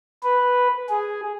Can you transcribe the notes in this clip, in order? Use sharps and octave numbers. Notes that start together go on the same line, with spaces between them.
B4
G#4